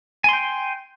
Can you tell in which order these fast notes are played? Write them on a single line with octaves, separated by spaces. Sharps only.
G#5 C6 G5